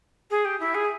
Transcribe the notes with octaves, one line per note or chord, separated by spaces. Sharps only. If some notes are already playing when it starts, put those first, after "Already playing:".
G#4
G4
E4
G#4